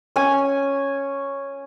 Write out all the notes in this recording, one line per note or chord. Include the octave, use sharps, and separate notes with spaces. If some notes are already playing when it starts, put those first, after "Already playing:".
C#4 G#5